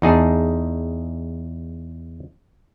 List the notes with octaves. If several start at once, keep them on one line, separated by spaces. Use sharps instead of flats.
E2 D#4 G#4 A5